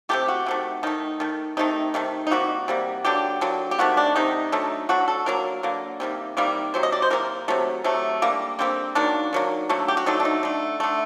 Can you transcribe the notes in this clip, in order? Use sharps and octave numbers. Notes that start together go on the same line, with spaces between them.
C3 D#3 A3 G4
F#4
C3 D#3 A3
D#3 A3 D#4
D#3 A3
C3 D#3 A3 D#4
C3 D#3 A3
D#4
C3 G3 A#3 F#4
C3 G3 A#3
D3 F#3 A#3 G4
D3 F#3 A#3
G4
C3 D#3 A3 F#4
D4
C3 D#3 A3 D#4
D3 F#3 A3
D3 F#3 A3 F#4
A4
D3 F#3 A#3 A#4
D3 F#3 A#3
C3 D#3 G3 A#3
C3 D#3 G3 A#3
C3 F#3 C5
D#5
D5
C5
C3 F#3 A#3 A#4
C3 F#3 A3
C3 F#3 A3
D3 G3 A#3
D3 G3 A#3 C4
D#3 F#3 A#3 D4
D#3 F#3 A#3
D3 F#3 A3
G4
F#4
D3 F#3 A3 D#4
D4
D#4
D3 A3
D3 A3